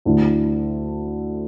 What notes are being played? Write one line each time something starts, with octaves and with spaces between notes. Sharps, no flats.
D2 D3 A3 E4